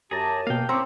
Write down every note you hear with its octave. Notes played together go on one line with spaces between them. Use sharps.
F#2 G4 G#4 A5 A#5
B2 A#3 F5 G5
C4 C#4 E4 C#5 A#5 D6